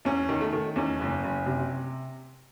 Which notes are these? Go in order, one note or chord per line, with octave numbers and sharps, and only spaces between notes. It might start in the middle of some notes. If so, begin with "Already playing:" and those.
E2 C#4
D#3
A3
D#3
E2 C#4
F#1
F#1
C3